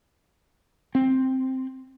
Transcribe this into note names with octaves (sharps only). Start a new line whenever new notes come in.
C4